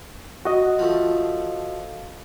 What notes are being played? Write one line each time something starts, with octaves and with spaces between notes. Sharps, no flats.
F#4 D#5
F3 A3